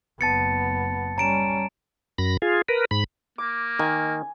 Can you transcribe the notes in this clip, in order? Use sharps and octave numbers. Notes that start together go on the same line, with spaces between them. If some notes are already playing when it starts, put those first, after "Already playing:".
F#1 B3 A5 A6 C#7
G3 C#4 A#5 D7 E7
F#2 B5 A#6
F4 G#4
A#4 B4
G#2 B5
A#3 D6
D#3 G#5